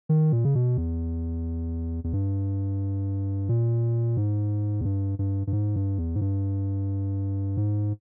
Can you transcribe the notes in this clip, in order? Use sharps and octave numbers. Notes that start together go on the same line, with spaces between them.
D#3
A#2
C#3
B2
E2
E2
G2
A#2
G#2
E2
G2
G2
G2
G#2
G2
E2
G#2
G2
G#2